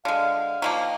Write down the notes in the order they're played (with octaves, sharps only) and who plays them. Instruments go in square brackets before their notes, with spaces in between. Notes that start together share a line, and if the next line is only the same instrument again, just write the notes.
[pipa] D3 G#3 [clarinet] F5
[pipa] D#3 F3 A#3